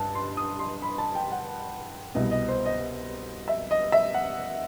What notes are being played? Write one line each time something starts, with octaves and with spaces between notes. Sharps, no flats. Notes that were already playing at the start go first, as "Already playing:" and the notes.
Already playing: G2 A5
C6
D#6
C6
B5
A5
G5
F#5
C2 B2 D#5
D#5
C5
D#5
E5
D#5
E5
F#5